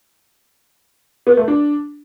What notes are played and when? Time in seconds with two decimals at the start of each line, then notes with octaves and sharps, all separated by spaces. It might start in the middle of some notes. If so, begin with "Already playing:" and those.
1.27 B3
1.37 A3
1.48 D4